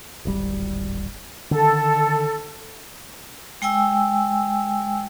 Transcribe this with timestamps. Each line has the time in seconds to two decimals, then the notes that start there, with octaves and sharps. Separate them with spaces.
0.25 D1 G#1 G3
1.51 D3 D#3 A4
3.62 G#3 G5 G#5 E6